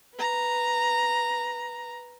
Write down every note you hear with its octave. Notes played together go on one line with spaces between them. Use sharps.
B4 A#5